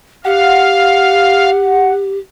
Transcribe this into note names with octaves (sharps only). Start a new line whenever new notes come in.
G4 F5 F#5